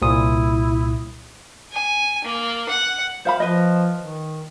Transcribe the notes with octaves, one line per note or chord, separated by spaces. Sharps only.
C2 A#2 E4 D#6
G#5
A#3
F#5
C5 F5 B5
F3 B4 D#5
D#3